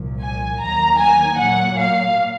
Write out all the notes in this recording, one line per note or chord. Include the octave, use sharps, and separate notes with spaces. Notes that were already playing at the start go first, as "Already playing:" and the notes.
Already playing: C2 A#2 F3
G#5
D#2 D#3 F#3 A#3 A#5
G#5
A#2 F#3 A#3 F#5
F5